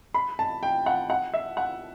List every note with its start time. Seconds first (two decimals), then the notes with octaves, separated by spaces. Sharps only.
0.14 B5
0.39 A5
0.63 G5
0.86 F#5
1.10 F#5
1.34 E5
1.57 F#5